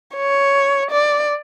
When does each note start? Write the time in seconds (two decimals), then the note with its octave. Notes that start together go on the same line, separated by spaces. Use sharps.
0.15 C#5
0.91 D5